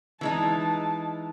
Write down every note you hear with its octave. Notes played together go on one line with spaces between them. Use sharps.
E3 G#3 D#4 A5